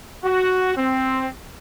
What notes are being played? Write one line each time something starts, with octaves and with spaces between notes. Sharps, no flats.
F#4
C4